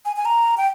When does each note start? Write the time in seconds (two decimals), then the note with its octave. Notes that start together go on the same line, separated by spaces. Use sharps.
0.05 G#5
0.16 G#5
0.25 A#5
0.57 G5